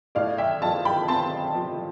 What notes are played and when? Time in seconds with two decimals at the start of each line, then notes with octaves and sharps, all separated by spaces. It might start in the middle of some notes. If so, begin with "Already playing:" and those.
0.15 A2 D5 F5
0.38 E5 G5
0.62 F3 F5 A5
0.85 G5 B5
1.08 C4 A5 C6
1.55 F3